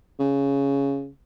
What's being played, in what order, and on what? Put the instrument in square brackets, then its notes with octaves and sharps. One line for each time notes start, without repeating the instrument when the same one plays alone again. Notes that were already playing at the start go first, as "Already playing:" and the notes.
[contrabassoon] C#3